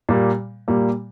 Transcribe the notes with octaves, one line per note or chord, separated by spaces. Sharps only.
A#2 G3 A#3
A#2 G3 A#3